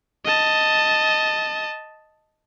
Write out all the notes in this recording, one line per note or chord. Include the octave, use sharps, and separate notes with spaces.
D#5 A5